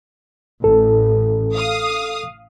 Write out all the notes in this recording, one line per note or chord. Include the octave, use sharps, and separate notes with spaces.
A1 A4
F5 D#6